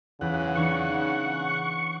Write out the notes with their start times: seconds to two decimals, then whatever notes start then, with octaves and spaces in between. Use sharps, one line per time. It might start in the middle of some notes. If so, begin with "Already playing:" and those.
0.21 E2 C#3 F#5
0.56 E3 D4 D#4 C#6